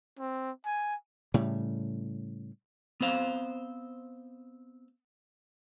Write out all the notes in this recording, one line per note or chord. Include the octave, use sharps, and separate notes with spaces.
C4
G#5
A2 C#3 G3
B3 C4 C5 F5